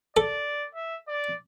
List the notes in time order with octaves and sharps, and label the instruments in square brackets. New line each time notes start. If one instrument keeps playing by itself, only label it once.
[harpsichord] A4 [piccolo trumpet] D5
[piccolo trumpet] E5
D5